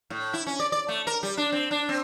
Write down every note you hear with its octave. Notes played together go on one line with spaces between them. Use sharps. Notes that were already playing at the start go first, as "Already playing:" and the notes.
A2
E4
C#4
D5
D5
A3
A#4
G3
D4
C4
D4
C4